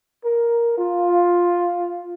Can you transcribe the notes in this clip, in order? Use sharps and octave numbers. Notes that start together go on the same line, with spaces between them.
A#4
F4